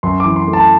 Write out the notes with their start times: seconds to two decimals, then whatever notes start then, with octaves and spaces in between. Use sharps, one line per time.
0.03 F#2 C6
0.20 E3 D6
0.36 C6
0.48 A3
0.53 A5